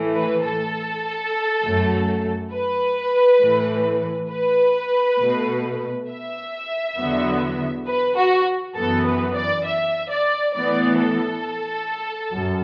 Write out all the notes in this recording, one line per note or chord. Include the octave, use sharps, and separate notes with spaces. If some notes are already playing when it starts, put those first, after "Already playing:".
Already playing: A2 E3 A3
B4
A4
F#2 F#3 A3
B4
A2 E3 A3
B4
B2 A3
E5
E2 D3 F#3 B3
B4
F#4
F#2 E3 B3 A4
B4
D5
E5
D5
A2 E3 B3 D5
A4
F#2